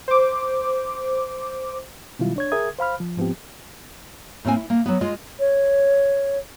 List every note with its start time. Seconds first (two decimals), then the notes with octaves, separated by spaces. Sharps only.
0.08 C5 D6
2.19 B2 D#3 F#3 G3 E4 F4
2.36 D4 C#5 G#6
2.52 G#4 A#4 E5 D#6 G#6
2.79 C5 F5 B5 F6
3.00 F3
3.17 G#2 F3 B3 C4 G4
4.45 A2 A#3 C4 G#5
4.56 E4
4.70 A#3
4.86 F#3 B3
5.01 G#3 F4 D#5
5.40 C#5